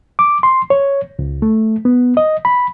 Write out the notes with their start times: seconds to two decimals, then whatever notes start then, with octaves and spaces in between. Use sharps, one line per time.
0.19 D6
0.43 C6
0.70 C#5
1.19 C#2
1.42 A3
1.85 B3
2.17 D#5
2.45 B5